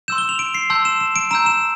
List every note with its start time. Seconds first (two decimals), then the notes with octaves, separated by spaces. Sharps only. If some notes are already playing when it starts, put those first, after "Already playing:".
0.08 C6 E6 G6 E7
0.18 G7
0.29 F7
0.39 D7
0.55 C7
0.70 A5 C6 E6 G6
0.85 E7
1.01 E7
1.16 D7
1.31 A#5 E6 G6 E7
1.46 E7